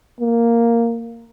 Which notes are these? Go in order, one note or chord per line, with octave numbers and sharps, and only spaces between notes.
A#3